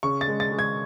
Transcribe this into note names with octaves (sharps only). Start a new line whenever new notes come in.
C#3 C#6
A6
G#3
A6
G#3
G#6